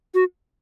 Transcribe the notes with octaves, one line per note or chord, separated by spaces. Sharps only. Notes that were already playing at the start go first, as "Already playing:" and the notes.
F#4